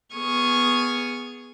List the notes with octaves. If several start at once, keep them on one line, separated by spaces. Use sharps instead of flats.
B3 G#4 C#6 D#6 F6